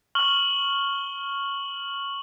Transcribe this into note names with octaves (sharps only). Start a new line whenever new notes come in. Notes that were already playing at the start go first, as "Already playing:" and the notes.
C#6 F6 F#7 G7